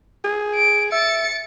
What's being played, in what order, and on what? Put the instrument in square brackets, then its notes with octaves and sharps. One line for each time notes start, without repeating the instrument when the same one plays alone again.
[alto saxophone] G#4
[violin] D7
[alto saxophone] E5 [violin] A6 C#7